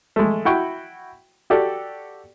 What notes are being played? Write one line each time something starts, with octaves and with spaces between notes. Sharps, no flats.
G#3 A3
E4 F#4 F#5 G5 C#6
F#4 G4 A4 D5